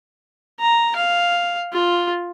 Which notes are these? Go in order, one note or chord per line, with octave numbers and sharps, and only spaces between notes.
A#5
F5
F4